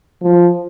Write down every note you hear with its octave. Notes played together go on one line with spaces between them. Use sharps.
F3